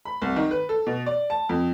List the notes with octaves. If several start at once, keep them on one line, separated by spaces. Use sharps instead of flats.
B5
C2
D#3
B4
A4
B2
D5
A5
F2